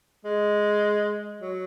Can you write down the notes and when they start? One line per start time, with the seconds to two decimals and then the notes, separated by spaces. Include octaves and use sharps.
0.25 G#3
1.41 F#3